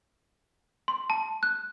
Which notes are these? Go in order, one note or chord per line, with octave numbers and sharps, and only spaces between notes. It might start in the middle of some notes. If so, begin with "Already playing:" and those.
C6
A5
F#6